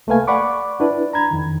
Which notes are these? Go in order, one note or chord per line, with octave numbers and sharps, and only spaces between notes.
C2 A3 A#3 B4 F5 G#5
D5 F#5 B5 C#6 D6
D4 E4 B4 D5
A#5 B5 G#6
F2 D#3